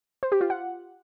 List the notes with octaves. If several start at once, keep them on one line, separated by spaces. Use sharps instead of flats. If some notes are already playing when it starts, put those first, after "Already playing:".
C5
G4
F4
F#5